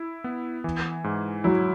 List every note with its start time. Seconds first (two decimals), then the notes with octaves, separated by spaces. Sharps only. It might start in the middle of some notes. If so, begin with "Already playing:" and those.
Already playing: E4
0.24 B3
0.64 E3
1.04 G#2
1.44 F#3 E4